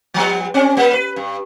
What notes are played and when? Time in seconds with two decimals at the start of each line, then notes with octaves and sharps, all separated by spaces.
0.14 F3 G3 B3
0.54 C4 C#4 D5
0.77 G3 A#3
0.93 B4
1.16 G2